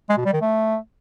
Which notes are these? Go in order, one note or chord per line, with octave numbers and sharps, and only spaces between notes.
G#3
B2
G3
D#3
A3